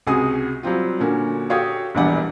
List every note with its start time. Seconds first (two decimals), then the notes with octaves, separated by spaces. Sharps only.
0.07 C#2 C3 F#4 G#4 G#5 D#6
0.63 F#3 G3 C4 F4
1.00 A#2 D3 C#4 F#4
1.50 F#4 G4 A4 C#5 F5 D#6
1.95 E1 A#1 E2 G3 F#5